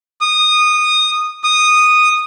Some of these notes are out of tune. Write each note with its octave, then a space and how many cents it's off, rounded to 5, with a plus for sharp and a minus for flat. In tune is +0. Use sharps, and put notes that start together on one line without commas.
D#6 -15
D#6 -10